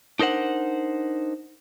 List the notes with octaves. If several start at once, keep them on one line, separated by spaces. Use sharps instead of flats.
D4 D#4 A#4 C5 F#5